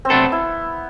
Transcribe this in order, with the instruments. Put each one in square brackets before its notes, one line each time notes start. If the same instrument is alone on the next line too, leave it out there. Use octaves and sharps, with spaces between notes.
[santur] C4
[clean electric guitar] C3 F#3 A3 D4 A4 [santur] B3
[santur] E4